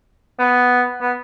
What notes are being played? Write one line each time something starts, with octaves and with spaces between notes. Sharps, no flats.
B3
B3